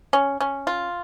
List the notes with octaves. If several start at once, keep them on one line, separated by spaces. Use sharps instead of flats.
C#4
C#4
F4